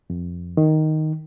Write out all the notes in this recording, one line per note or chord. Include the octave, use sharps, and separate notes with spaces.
F2
D#3